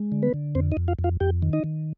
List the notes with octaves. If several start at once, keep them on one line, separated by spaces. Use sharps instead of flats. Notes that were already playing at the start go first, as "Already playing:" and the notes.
Already playing: G#3
D3
B3 B4
D3
F2 C4 C5
D#4 D#5
F2
F4 F5
F2
F4 F5
F2 G4 G5
D#3
D#4 D#5
D#3